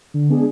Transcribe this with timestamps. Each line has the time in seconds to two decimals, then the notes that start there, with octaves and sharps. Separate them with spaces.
0.14 D3
0.29 G#3 B3 D4 G#4